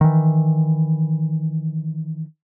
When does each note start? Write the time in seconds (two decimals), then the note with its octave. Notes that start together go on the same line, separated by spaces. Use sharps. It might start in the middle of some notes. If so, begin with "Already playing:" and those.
0.01 D#3 E3